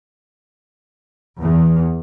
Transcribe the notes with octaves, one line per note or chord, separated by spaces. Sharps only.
E2